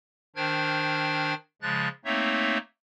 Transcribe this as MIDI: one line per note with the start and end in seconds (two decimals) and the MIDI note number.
0.36 1.34 51
0.36 1.34 62
0.36 1.34 72
0.36 1.34 79
0.36 1.34 89
0.36 1.34 92
1.62 1.88 49
1.62 1.88 53
1.62 1.88 56
1.62 1.88 90
1.62 1.88 93
2.05 2.58 57
2.05 2.58 58
2.05 2.58 60
2.05 2.58 63
2.05 2.58 73
2.05 2.58 76